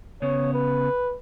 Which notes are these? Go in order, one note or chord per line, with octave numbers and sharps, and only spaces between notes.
C#3 B3 C#5
B4